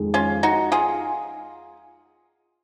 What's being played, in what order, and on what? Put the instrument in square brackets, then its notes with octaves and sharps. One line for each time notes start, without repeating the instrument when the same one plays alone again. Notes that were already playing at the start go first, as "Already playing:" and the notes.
Already playing: [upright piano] F2 D#3 G#3
[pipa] C#4 F4
D#4 F#4
F4 G#4